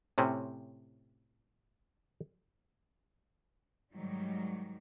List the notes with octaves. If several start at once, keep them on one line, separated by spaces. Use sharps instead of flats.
A2 C3 C4 C#4
G#2 D#3 F#3 G3